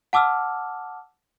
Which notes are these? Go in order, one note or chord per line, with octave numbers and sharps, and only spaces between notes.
F#5 A5 D6 E6 F6